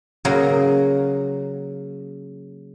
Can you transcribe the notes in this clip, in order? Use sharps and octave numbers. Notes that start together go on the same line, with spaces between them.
C#3 F#3 A#3